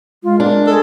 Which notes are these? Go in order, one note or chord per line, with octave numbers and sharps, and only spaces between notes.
G#3 F4
D4 A#4
G#3 A4